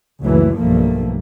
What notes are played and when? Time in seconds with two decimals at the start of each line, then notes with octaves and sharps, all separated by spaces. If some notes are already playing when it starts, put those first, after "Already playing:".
0.23 F#1 C#2 E3 F#3 A3
0.55 B1 G2 F3 A3 A#3